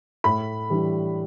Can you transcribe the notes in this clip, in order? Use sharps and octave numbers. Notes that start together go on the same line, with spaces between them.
A2 B5
E3 G3 D4